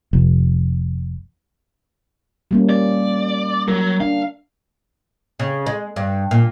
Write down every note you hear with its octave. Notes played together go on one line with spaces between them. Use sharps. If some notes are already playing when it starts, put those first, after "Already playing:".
F1
G3 A#3 C#4
D5
F#3 A#4
D4 F5
C#3
G#3
G2
A#2